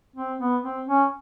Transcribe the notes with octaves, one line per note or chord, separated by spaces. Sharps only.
C4
B3
C4
C#4